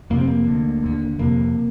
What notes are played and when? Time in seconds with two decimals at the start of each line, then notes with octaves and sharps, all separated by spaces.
0.10 F2 C3 A#3
0.18 C4
0.27 A#3
0.47 D2 D3
0.83 D#2 D3
1.19 F2 C3 A#3